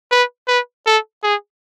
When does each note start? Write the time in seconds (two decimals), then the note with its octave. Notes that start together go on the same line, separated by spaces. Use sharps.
0.11 B4
0.48 B4
0.86 A4
1.23 G#4